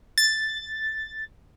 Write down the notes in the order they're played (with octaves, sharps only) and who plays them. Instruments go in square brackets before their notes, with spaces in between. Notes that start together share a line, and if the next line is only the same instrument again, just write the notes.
[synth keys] A6